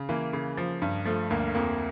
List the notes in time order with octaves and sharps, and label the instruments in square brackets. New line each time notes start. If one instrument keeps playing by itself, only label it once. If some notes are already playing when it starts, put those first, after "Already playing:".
Already playing: [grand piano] C#3
E3 A#3
C#3
F3
G2
F3 A3
D2 A#3
F2 A#3